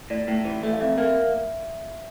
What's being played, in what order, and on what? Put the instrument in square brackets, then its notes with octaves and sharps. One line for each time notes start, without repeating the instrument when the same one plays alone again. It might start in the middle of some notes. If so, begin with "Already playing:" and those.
[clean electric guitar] A2 [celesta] D5
[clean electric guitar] A2
E3
A3
[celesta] F5
[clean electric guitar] F2 [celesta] E5
[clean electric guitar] A#3
[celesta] E5